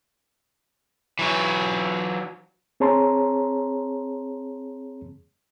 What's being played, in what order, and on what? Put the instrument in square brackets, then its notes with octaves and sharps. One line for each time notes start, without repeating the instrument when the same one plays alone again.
[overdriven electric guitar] E3 F#3
[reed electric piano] C4 G#4 C#5 A5 A#5 C6